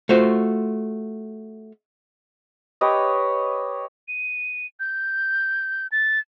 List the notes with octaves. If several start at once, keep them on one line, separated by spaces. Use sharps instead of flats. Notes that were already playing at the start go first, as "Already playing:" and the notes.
A3 F4 F#4 C5
G4 B4 C#5 D#5
D#7
G6
A6